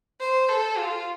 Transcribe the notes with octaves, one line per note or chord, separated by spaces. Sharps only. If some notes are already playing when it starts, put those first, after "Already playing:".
C5
A4
F4